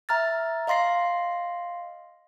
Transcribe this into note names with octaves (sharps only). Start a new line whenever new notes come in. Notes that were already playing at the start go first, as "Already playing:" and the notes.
E5 A#5 F6 A6
D#5 F5 C6 A#6 C7